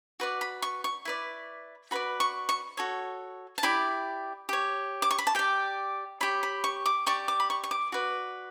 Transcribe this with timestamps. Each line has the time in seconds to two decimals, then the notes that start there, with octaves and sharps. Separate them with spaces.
0.20 F#4 B4 D5
0.41 B5
0.62 C#6
0.84 C#6
1.05 E4 B4 D5
1.91 F#4 B4 D5 B5
2.20 C#6
2.49 C#6
2.77 F#4 A4 C#5
3.58 A5
3.63 E4 G4 D5 B5
4.49 G4 C#5
5.02 D6
5.11 C#6
5.19 B5
5.27 A5
5.35 G4 D5 G5
6.21 G4 C#5 B5
6.43 B5
6.64 C#6
6.86 D6
7.06 G4 D5 C#6
7.28 D6
7.40 B5
7.50 C#6
7.64 C#6
7.71 D6
7.92 F#4 B4 D5